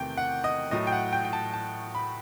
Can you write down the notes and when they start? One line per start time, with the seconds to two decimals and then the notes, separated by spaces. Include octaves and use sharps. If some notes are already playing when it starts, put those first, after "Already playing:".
Already playing: E2 C3 D#3 A3 G5
0.17 F#5
0.44 D#5
0.71 A2 F#3 A3 D#5
0.87 G5
0.92 F#5
1.13 G5
1.25 G5
1.33 A5
1.54 A5
1.95 B5